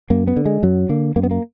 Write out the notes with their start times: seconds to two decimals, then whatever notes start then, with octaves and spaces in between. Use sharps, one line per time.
0.10 F#2 A#3
0.27 B3
0.37 D3
0.46 G#3
0.63 F#2 F#3
0.89 D3 A#3
1.16 F#2 A#3
1.23 B3
1.31 A#3